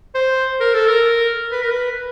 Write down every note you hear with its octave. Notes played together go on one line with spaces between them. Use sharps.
C5
A#4
A4
A#4
B4
A#4
B4